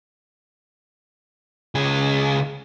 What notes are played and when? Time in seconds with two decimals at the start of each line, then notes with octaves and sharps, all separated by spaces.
1.75 C#2 G#4